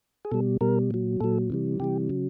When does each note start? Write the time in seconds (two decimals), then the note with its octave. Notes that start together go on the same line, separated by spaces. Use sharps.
0.25 G#4
0.31 B2 G3 A4
0.61 B2 G3 A#4
0.91 A#2 F#3
1.20 A#2 F#3 A4
1.50 C3 E3 G3
1.80 C3 E3 G3 G4
2.09 C#3 F#3